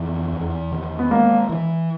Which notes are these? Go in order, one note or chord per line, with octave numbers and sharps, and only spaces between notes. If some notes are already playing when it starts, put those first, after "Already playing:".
Already playing: F2 E3
E2
D#3
B3
G#3 A#3
E3